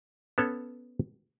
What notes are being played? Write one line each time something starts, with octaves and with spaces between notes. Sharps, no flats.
B3 C#4 A4 C#5